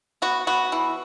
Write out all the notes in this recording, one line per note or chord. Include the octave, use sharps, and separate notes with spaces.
B3 F#4
B3 F#4
E3